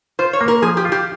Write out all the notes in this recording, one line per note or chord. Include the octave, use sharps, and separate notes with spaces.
F4 C5
C#5
A#3
A#4
F3 G#4
G4
F4
G4